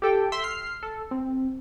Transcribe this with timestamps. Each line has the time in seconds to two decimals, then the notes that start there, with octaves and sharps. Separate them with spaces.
0.02 G4 A4 G5
0.32 E5 C6 E6 B6
0.44 F6 C7
0.83 A4
1.11 C4